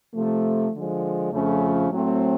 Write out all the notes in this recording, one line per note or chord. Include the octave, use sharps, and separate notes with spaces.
C3 F3 A3
D3 F3 G#3
F2 C#3 F3 A3 C#4
A2 F#3 A3 C4